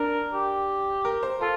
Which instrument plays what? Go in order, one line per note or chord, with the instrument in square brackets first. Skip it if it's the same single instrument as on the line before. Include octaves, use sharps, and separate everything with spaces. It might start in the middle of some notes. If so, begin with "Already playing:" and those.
Already playing: [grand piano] D4 [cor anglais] A#4
[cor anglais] G4
[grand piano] A#4
C5
[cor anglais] F4 [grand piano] A4